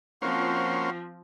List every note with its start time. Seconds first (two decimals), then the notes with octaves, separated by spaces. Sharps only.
0.22 F3 A#3 C4 C#4 F#4 C5 F5 F#5